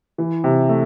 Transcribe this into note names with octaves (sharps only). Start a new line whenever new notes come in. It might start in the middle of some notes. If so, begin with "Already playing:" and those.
E3
C3
A3